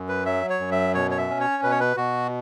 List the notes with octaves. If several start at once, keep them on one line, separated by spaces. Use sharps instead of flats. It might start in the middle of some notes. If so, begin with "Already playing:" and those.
Already playing: F#2
B4
F#3 E5
C#5
F#2
E5
B2 C#5
C#5
E5
C#4
C#5
B2 B4
C#5
B4
B2 F#4